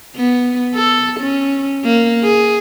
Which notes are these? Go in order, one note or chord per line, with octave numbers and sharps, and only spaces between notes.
B3
A4
C#4
A#3
G#4